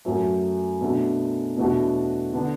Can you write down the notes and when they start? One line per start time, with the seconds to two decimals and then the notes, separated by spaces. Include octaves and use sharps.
0.05 F#2 F#3 A3
0.81 B2 A3 D4 F#4
1.57 E2 B2 A3 D4 F#4
2.33 D3 B3 D4